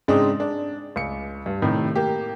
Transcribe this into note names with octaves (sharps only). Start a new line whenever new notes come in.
G#2 C#3 G#3 C4 D4 D#4
D4
C#2 C#7
G2
A2 C3 D#3
A#3 G4